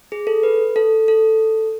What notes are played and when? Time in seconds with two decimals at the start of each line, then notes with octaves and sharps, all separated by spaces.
0.12 G#4
0.27 A4
0.43 B4
0.76 A4
1.08 A4